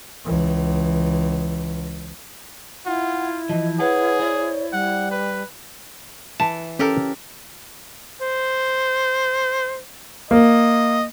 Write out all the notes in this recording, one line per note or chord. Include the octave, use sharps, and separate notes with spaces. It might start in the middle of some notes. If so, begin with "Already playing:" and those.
C#2 E3
E4 F4 F#5
E3 F3 D#5
G#4 B4 C#5 F#5 G#5
C5 D5
G3 F#5
B4
E3 A5
C#4 G4 A4 A#4
C5
A#3 D#5